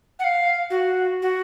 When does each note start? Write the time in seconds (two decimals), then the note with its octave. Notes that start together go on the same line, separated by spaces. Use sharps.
0.19 F#5
0.24 F5
0.70 F#4
1.22 F#4